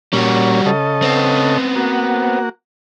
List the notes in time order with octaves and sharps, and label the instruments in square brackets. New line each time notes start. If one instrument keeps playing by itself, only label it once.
[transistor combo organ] A#2 C#4 [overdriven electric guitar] G3 F#4
[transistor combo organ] C#3 A4 D#5
[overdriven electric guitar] B3 C4
[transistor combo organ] A#3 F#4